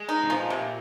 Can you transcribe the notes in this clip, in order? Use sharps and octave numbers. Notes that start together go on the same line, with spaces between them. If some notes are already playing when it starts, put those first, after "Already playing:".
Already playing: G#3
D#4
C3
A#2 F3
C3